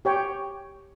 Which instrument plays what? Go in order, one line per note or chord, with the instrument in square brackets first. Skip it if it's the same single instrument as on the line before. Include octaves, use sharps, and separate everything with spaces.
[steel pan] G4 C#5 G5